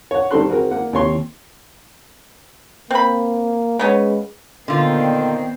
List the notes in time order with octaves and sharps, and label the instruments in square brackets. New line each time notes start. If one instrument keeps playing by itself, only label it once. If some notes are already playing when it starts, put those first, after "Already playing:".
[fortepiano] C#5 F#5
D#3 G3 C4 A4 C6 F#6
C4 F#4 G#4 A#4
A#3 F#5
D#2 C3 C#5 C6
[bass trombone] A#3 [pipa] C4 B5
[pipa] C#3 B3 C#4 [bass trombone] G#3
[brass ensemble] A#2 D#3 [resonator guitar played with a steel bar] D3 F4 [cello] B3 C4